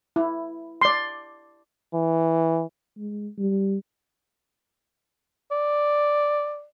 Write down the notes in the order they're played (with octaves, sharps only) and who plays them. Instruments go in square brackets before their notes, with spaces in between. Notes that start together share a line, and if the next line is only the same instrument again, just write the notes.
[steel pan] E4
D5 C6
[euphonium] E3
[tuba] G#3
G3
[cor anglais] D5